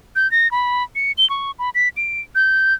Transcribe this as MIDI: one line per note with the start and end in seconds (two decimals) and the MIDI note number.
0.16 0.30 91
0.31 0.50 94
0.51 0.83 83
0.96 1.12 97
1.18 1.28 103
1.30 1.51 85
1.59 1.70 83
1.75 1.89 95
1.97 2.21 98
2.35 2.74 91